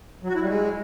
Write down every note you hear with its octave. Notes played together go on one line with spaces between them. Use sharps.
F#3
F#4
E4
G3
G#3